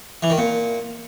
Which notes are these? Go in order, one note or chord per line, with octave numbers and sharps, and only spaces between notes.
E3
D#3
A#2